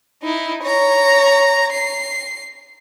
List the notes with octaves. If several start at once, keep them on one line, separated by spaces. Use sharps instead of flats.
D#4 E4
C#5 A#5
C7